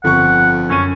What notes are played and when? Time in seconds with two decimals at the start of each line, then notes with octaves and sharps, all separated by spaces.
0.04 G1 F2 F#5 C#6
0.70 F#2 C#4 D#7